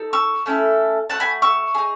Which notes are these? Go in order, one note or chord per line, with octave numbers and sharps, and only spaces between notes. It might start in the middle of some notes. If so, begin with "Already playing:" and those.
Already playing: D#4 A4
C#6 E6
A3 C#4 E4 A4
A3 D#4 F#4 F#5 A5
G#5 B5
C#6 E6
D#4 G#4